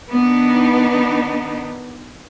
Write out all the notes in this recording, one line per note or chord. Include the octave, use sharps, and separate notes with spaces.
D#3 B3 D4 D#4